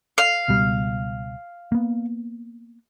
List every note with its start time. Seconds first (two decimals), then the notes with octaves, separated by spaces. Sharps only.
0.18 F5
0.48 C#2 B2 G3
1.72 A#3 B3